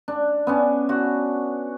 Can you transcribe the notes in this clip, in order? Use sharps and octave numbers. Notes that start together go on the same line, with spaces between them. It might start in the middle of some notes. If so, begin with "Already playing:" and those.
D4
B3 C#4 D4
F#4